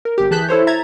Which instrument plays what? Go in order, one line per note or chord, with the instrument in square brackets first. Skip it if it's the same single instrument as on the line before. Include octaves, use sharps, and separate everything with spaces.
[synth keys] A#4
G1 G4
E3 G#4 A5 F#6 G6 B6
E4 A4 C5 C#5
E5 A#5 G#6 A6